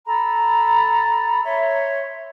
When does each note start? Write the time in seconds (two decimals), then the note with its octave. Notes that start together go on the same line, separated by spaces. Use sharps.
0.05 A4 A#5 B5
1.44 C#5 E5 C6